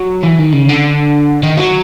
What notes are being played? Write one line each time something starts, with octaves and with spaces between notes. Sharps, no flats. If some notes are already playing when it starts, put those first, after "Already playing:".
Already playing: F#3
E3
D#3
C#3
D3
D#3
F#3